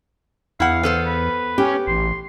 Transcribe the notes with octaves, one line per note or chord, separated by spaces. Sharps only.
E2 E4 F5 F#5
B3 A4 C5
B4
C#4 G4
A1 C6